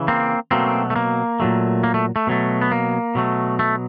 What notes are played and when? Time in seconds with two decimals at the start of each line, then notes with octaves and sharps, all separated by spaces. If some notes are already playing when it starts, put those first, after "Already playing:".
Already playing: C#3 E3
0.08 A#3 C4
0.51 B2 F#3 A3 A#3 C4
0.90 A3
0.96 A#3
1.40 A#2 F#3 A3
1.84 A#3
1.94 A3
2.16 A3
2.27 B2 F#3 A3
2.62 B3
2.71 A#3
3.15 B2 F#3 A3
3.59 A3